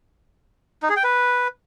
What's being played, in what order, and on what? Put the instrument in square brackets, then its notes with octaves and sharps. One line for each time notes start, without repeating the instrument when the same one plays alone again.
[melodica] D#4
G#4
G5
B4